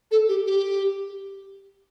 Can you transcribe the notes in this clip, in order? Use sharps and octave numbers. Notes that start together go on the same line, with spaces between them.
A4
G4
G4